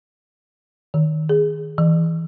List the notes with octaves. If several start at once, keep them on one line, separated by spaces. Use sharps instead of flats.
D#3
G#4
E3